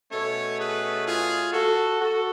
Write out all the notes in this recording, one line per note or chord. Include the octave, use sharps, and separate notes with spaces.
B2 A3 C#4 A4 C#5
G#4 B4
F4 G#4
F#4 A4
F#4 A4